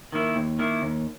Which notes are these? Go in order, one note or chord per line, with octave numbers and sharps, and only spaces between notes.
D#3 A#3 E4
D#2
D#3 A#3 E4
D#2